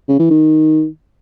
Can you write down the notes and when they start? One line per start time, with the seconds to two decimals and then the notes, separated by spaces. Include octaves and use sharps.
0.08 C#3
0.19 E3
0.30 D#3